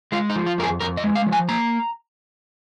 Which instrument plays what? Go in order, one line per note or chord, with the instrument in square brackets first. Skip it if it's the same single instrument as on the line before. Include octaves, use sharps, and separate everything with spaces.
[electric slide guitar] G#3 F4
D#4
F3
F4
F2 A#4
G#4
F2 A#4
D#5
G#3
F5
F3
G#5
A#3 A#5